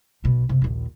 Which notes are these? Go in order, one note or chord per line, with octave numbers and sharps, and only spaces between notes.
B1 B2
F#1 C3
A#1 D#2